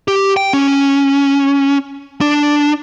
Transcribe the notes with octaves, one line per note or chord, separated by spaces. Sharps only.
G4
G5
C#4
D4